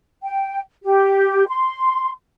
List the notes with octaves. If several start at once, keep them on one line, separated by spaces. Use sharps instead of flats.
G5
G4
C6